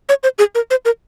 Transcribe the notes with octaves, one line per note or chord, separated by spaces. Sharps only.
C#5
C5
G#4
A#4
C5
A#4